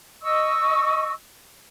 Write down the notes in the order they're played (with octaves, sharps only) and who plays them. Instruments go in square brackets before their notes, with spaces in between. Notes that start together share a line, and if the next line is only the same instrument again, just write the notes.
[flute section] D#5 C#6 E6